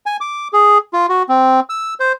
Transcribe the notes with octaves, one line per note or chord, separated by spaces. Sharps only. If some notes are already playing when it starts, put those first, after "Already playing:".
G#5
D6
G#4
F4
F#4
C4
E6
C5